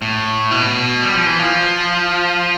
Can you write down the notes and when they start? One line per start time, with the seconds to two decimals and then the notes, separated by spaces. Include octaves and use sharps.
0.02 A2
0.51 B2
1.02 G3
1.14 F3
1.26 E3
1.39 F3